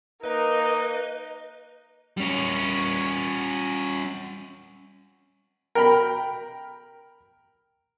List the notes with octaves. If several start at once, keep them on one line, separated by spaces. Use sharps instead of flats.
A#3 D#4 B4 D#5
G3 C#4
A#4 G5 B5